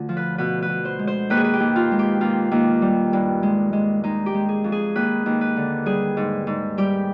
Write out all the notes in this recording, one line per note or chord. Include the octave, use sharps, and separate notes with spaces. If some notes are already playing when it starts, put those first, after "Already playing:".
Already playing: D2 D3 F4
F3
B4
B2 B4
B4
B2
C5
G#3
C5
D#2 B4
G#4
B4
G4
D#2
F4
G#3
G4
D#2 F4
D#2
G3
G2
G#3
G#3
G#3 D#4
G4
G#3
G#4
F2
G#4
D#2 B4
D#2
B4
D3
G3 G#4
G#2
G#2
G3 G4